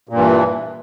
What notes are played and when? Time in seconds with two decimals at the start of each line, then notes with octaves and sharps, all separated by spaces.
0.09 A#2
0.13 G2
0.17 E3